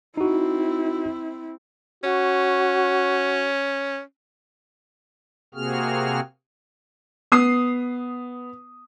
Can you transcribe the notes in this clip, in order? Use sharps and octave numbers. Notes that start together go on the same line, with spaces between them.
C4 D#4 E4 F#4
C#4 F#4
C3 A#3 C4 F#4 G#4 F6
B3 D#6 C7